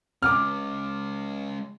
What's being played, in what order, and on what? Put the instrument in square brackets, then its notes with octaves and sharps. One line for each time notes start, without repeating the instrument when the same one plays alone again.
[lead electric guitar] G#3 C#4 [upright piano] D6 F6